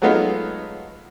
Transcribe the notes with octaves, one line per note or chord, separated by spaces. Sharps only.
F#3 G#3 A3 B3 D#4 F4